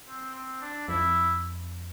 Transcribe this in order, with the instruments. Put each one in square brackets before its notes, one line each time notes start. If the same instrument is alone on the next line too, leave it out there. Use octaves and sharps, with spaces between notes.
[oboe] C4
C4
D4
[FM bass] F2 [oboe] E4